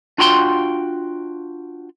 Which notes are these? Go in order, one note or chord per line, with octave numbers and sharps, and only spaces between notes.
D4 F4 F#4 G5 G#5 C6